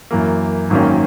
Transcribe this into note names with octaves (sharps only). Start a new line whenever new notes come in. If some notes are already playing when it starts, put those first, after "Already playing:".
F#2 E3 A#3
G#1 F#2 D#3 A#3 C#4